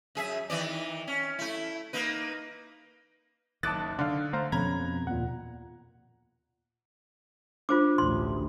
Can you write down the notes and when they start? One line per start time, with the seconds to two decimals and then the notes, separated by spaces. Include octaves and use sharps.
0.15 F#2 G#4 E5
0.50 D#3 E3 D5
1.07 C#4
1.39 A3 E4
1.93 A#3 D#4 B4
3.63 F#1 D#3 A5 D6 D#6 F#6 A6
3.99 D3 D4 F5
4.33 A3 C5 F5 A#5
4.52 F2 B2 F3 C#4 A#5 B5 G#6
5.07 D#2 A#2 F#5
7.69 D4 F4 C5 D6
7.98 A1 D2 C6